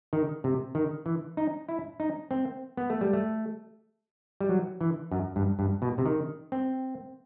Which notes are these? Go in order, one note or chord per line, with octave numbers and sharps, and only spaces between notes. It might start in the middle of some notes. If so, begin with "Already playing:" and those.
D#3
C3
D#3
E3
D#4
E4
D#4
C4
B3
A3
G3
A3
G3
F#3
E3
F#2
G2
G2
B2
C3
D#3
C4